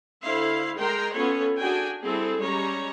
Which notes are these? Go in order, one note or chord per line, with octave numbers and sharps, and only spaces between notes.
D3 E4 C5 F5
G#3 A#4 G5 A#5 C6
B3 C#4 F4 A4 B4 C#5
D4 F#4 G#4 G5 G#5
G3 C4 E4 G#4 A4
G3 G#3 C#4 C#5 A#5